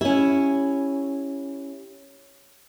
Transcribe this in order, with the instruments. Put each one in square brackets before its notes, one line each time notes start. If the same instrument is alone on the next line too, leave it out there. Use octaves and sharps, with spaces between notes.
[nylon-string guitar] C#4 E4 [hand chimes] G4 C#5